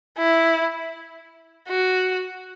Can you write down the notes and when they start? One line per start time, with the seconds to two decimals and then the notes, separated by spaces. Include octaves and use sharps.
0.18 E4
1.69 F#4